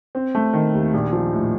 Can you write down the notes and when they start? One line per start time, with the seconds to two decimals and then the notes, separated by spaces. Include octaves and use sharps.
0.15 C4
0.35 A3
0.53 D#3
0.74 D#2
0.94 A#1
1.13 F3
1.33 A2